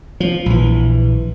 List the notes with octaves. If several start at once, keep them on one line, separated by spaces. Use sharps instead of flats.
F3
A#1 E3